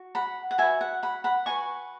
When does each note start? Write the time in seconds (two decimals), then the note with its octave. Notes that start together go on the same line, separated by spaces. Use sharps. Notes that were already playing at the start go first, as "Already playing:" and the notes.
Already playing: F#4
0.15 F#5 B5
0.51 F#5
0.58 F#4 B4 E5 G#5
0.81 F#5
1.03 F#5 B5
1.24 F#5 B5
1.46 F#4 B4 G#5 C#6